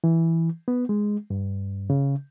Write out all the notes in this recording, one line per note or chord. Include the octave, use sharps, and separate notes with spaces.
E3
B3
G#3
G2
C#3